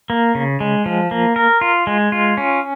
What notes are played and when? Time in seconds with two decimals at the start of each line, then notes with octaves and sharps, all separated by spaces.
0.10 A#3
0.35 C#3
0.60 G#3
0.86 F3
1.11 A#3
1.36 A#4
1.61 F4
1.87 G#3
2.12 F4
2.37 C#4